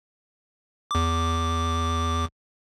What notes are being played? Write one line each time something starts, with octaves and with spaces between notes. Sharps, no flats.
E2 D6